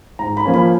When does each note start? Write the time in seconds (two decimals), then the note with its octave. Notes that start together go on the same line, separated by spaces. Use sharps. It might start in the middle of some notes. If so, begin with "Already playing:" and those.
0.19 G#2 A#5
0.37 B5
0.45 F3 A#3 C#4
0.54 B5